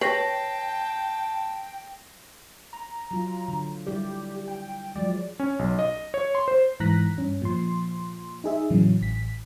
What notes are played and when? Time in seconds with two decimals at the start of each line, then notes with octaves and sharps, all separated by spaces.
0.01 B4 C#5 G5 A5 A#6 C7
2.73 A#5
3.11 F#3 F4
3.48 D3
3.87 G3 E4 G4 D5
4.48 G5
4.96 F3 F#3 G#3 D5
5.40 C#4
5.59 B1
5.79 D#5
6.14 C#5
6.35 C6
6.48 C5
6.80 G#2 E3 A#5 F#6 A#6 B6
7.17 G2 C#4
7.42 A#2 F3 C6
8.44 D#4 G#4 E5
8.70 A2 C#3 E3 F#3
9.01 A1 B6